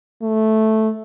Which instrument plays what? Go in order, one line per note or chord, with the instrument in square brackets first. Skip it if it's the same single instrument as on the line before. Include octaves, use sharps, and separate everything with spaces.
[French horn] A3